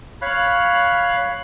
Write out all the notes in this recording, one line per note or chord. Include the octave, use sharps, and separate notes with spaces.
C#5 F5 B5 F#6